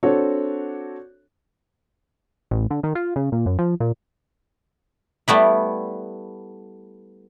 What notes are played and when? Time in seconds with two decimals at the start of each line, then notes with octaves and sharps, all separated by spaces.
0.03 C4 D4 F#4 A4 C#5
2.51 A1
2.70 D3
2.83 D#3
2.95 F4
3.16 C#3
3.32 A#2
3.46 F#2
3.59 F3
3.80 A#2
5.28 G3 A3 B3 E4